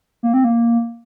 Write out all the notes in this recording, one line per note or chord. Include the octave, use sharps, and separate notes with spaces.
A#3
C4
A#3